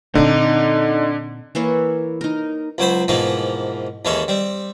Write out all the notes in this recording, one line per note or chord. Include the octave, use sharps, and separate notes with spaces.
A#2 D3 C4 D4 D#4
E3 A#3 E4 C#5
D#4 A#4
C#2 F#3 C5 B5
G#2 B2 E3 F3 A#3
D#2 E3 G#3 C#4 A4
G3 C4